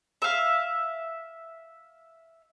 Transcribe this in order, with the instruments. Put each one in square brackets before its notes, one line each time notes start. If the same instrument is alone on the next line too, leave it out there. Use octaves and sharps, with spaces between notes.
[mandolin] E5 F5